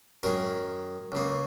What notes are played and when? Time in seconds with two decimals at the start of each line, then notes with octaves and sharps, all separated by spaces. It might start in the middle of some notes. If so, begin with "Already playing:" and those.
0.23 F#2 D#3 G#3 A#4
1.12 C#2 C#3 A#3